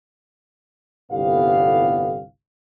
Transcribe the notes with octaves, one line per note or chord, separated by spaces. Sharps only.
G1 C2 A2 B3 G4 F5